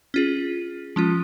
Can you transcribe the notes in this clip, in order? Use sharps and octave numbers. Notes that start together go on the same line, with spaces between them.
C#4 F4 G#4
F3 G#3 C#4 F4